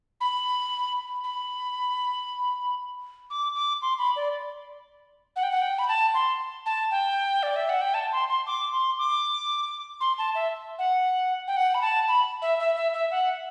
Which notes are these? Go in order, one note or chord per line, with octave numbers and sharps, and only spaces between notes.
B5
B5
D6
D6
C6
B5
D5
F#5
G5
F#5
G5
B5
A5
C6
A5
G5
D5
E5
F#5
G5
A5
C6
C6
D6
C6
D6
C6
A5
E5
F#5
G5
F#5
B5
A5
B5
E5
E5
E5
E5
F#5